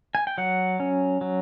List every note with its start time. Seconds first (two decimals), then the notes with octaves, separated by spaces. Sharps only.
0.15 G#5
0.27 G5
0.38 F#3 F#5
0.80 C#4
1.21 F#3